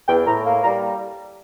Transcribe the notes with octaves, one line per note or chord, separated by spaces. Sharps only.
E2 G5
A2 A#5
A#3
G3 A#5